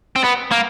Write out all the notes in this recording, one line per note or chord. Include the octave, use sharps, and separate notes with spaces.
C4
B3
A#3